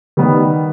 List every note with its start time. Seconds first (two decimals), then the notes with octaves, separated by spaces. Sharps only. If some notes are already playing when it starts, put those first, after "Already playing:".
0.17 D#3 G3 B3